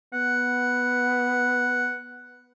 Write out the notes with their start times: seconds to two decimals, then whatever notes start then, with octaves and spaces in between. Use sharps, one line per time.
0.13 B3 F#5